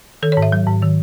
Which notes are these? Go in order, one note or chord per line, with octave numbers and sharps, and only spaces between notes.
D#3 A4
C#5
G#2
E5
F#3
G#2
D#3